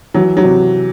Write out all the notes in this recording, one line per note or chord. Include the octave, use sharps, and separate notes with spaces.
E3 F#3
F#3
C3